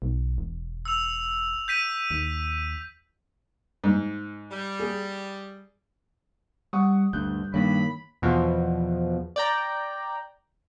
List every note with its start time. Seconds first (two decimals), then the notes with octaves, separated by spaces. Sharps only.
0.02 B1
0.38 E1
0.85 E6 F7
1.68 G6 B6 D#7
2.11 D#2
3.84 G#2
4.51 G3
4.79 G#4
6.73 G3 F#5 C#6 D#6
7.13 D2 G2 F#6 G6
7.54 G2 D#3 A#3 C#5 B5
8.22 E2 B2 F3
9.36 D5 G5 A#5